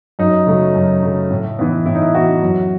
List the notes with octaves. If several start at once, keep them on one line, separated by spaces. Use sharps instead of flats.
F#2 D#4
C#3 F#3 A3
F#2
C#3 F#3 A3
A2
E3 B3
A2 E4
D#4
E4
E3 B3 F#4
F#2